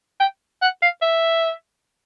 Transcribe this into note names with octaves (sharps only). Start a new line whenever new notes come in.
G5
F#5
F5
E5